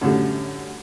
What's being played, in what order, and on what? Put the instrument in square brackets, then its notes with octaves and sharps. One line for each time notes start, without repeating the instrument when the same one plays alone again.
[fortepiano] F#2 A2 D3 G3